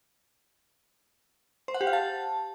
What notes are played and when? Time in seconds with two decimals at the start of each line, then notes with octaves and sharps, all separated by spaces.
1.68 C5
1.74 F#5
1.81 G4
1.87 F5
1.93 A5